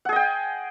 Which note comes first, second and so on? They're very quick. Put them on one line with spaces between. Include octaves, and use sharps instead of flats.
F#5 G#4 D#5 G5